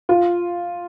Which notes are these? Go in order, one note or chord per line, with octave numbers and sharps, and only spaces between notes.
F4